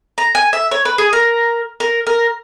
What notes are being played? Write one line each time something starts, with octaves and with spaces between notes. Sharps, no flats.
A#5
G#5
E5
C#5
B4
G#4
A#4
A#4
A#4